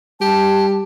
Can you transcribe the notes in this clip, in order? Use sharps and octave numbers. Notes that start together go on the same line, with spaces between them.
G3 G4 A5